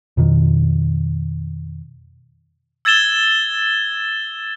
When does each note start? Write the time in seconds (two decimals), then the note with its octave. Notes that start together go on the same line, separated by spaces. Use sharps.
0.17 F2 B2 D#3
2.85 E6 G#6 A6 E7 G7